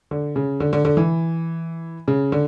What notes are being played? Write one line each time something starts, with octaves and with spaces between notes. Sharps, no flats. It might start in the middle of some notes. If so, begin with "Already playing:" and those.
D3
C#3
D3
D3
D3
E3
C#3
D3